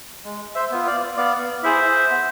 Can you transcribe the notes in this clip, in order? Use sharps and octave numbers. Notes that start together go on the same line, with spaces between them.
G#3
C5 E5
B3 F4
D5 F5
B3 D5 F5
E4 G#4 C5 E5
B3